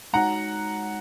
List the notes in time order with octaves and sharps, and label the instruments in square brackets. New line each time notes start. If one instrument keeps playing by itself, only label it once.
[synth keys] G#3 D#4 F#4 C#5 [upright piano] F#5 A#5